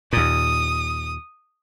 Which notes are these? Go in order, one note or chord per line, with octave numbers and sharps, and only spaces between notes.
D#2 A#2 D#6